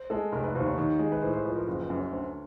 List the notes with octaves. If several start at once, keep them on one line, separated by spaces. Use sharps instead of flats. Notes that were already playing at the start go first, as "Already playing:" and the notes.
Already playing: C5
G#3 A4
F1 A#4
B4
D#2 C5
C#5
D#3
G#3
B4
A2 C5
C5
F3 B4
A#4
F#1 A#4
B4
F#2
C#5
D2 C5